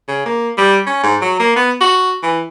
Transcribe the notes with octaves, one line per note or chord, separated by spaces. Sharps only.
C#3
A#3
G3
C#4
G#2
F#3
A#3
B3
F#4
E3